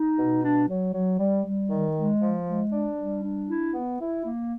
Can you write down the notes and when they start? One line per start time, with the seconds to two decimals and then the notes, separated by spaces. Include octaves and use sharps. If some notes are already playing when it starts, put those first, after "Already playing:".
Already playing: D#4
0.17 B2
0.44 D4
0.69 F#3
0.94 F#3
1.19 G3
1.46 G3
1.70 D#3
1.96 G#3
2.21 F3
2.47 G#3
2.72 D4
2.97 G3
3.23 D4
3.49 E4
3.74 B3
4.00 E4
4.26 A#3